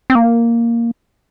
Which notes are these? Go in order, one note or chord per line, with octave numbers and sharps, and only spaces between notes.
C4
A#3